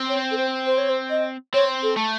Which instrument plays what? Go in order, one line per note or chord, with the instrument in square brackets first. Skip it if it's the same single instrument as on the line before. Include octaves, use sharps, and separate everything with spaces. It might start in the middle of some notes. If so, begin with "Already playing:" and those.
Already playing: [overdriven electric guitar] C4
[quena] C#5
A4
C5
C5
C#5
C5
D#5
[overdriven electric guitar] C4 [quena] C#5
[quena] A4
[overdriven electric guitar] A3